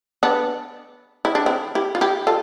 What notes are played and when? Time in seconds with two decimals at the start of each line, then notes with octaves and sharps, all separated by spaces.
0.23 B3 D4
1.25 E4
1.35 D4
1.46 C4 E4
1.75 E4 G4
1.95 F4
2.01 E4 G4
2.27 F4 A4